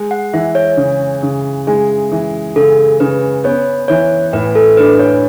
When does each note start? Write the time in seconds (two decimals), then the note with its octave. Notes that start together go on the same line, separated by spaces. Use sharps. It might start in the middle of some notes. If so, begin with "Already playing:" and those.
Already playing: G#3
0.11 F#5
0.33 E3 E5
0.55 C#5
0.77 C#3
1.23 C#3
1.67 G#3
2.12 E3
2.56 C#3 A4
3.00 C#3 B4
3.44 B3 C#5
3.88 E3 C#5
4.33 A2 B4
4.55 A4
4.77 D4 B4
4.99 C#5